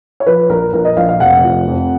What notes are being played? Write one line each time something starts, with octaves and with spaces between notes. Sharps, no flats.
C#5
F3 B4
A#1 A#4
A#1 A#4
D#5
A#1 F5
F5
F1 F#5
F3
F2